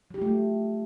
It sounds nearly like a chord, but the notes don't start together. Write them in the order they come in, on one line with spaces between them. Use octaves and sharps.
F#3 G4 F4 A3